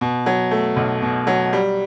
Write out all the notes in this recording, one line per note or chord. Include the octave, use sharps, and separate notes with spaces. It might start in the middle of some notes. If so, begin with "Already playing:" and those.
B2
F#3
A3
B1
B2
F#3
G3